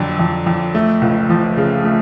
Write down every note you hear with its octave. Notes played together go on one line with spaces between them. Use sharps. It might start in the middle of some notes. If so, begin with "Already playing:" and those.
Already playing: F2 D3 F#3
F2
F2
A3
C#2
F3
C#3
A3